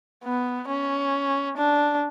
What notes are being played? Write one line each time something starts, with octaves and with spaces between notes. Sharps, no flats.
B3
C#4
D4